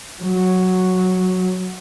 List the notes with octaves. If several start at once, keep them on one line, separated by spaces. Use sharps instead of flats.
F#3